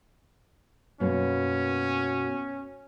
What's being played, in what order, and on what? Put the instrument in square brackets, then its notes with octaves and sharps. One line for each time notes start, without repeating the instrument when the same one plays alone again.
[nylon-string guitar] F#2 B2 A#3 [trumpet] C#4